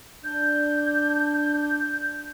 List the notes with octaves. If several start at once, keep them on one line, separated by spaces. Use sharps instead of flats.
D4 G6